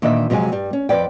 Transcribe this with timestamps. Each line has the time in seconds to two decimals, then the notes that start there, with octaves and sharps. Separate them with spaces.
0.02 A#2 D#3 E3 D4 D#5 E5
0.30 F2 C3 F#3 G#3 G#5
0.52 G2 G3
0.73 C#4
0.89 F2 B4 D5 G5